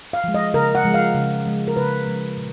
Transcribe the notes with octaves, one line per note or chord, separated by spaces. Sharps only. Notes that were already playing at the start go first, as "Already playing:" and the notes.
F5
F3 G#3
D#5
C#3 A#4
F#5
F3 G#3
F5
C#3
F3 G#3
A#4
C#3 B4
F3 G#3
A#2